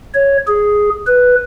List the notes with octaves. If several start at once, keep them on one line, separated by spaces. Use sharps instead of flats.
C#5
G#4
B4